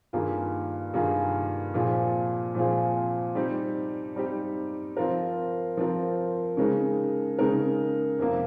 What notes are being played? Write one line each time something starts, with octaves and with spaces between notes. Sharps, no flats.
G2 D#3 A#3 F4 G#4
G2 D#3 A#3 F4 G#4
A#2 F3 C4 F4 G#4
A#2 F3 C4 F4 G#4
G3 C4 D#4 G4
G3 C4 D#4 G4
F3 C4 F4 A#4
F3 C4 F4 A#4
C#3 G#3 D#4 A#4
C#3 G#3 D#4 A#4
F2 C3 F3 A#3